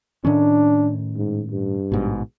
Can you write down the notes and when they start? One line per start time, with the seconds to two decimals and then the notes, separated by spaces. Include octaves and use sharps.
0.25 A2 D#3 C#4 D4
1.16 G#2
1.50 G2
1.92 A1 G#2 B2